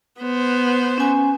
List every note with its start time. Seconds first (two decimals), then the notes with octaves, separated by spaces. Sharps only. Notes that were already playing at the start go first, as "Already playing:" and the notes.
0.20 B3 C5
0.98 C#4 G#5